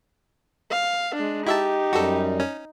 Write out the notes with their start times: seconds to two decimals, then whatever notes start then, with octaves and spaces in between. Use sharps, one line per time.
0.71 F5
1.15 G#3 D4
1.47 D#4 E4 G4 E5 A5
1.93 F#2 G3 F#4 A4
2.40 C#4